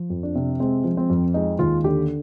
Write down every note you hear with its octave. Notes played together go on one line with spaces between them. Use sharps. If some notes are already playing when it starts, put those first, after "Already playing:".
Already playing: F3
F2
D4
C3
G#3 C4
F3
C4
F2
G#3 D#4
D#2 F4
D3 G4